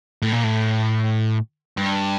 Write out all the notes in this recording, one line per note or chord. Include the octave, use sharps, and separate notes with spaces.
A2
A#2
A2
G2